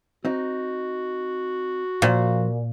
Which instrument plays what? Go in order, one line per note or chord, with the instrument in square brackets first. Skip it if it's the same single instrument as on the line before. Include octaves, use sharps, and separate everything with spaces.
[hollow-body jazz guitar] C4 D#4 [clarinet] F#4
[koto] A#2 [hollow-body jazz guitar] F3 C5 F5